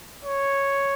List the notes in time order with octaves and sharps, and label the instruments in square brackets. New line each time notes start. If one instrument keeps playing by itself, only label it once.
[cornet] C#5